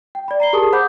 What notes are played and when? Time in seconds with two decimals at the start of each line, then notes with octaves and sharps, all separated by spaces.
0.15 G5
0.28 D5 B5
0.40 A#5 C7 G7
0.53 G4 G#4 A#4 A5 D#6
0.72 C5 F#5 B5 D6 D#6 G6